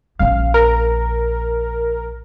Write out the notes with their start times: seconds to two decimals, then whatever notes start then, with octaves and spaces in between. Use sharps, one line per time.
0.19 A#1 C#4 F5
0.54 A#4